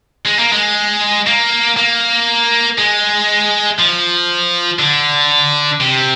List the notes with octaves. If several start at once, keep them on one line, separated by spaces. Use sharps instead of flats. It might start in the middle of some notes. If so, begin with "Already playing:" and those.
G#3
A#3
G#3
A#3
A#3
G#3
F3
D3
C3